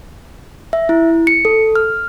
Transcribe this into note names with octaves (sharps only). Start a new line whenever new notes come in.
E5
E4
C#7
A4
F6